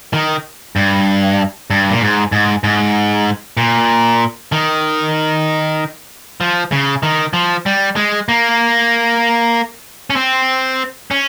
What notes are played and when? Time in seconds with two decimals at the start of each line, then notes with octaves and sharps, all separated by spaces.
0.13 D#3
0.76 G2
1.70 G2
1.91 A#2
2.01 G#2
2.32 G#2
2.64 G#2
3.57 A#2
4.52 D#3
6.41 F3
6.72 C#3
7.03 D#3
7.33 F3
7.66 G3
7.96 G#3
8.29 A#3
10.10 C#4
10.16 C4
11.11 C#4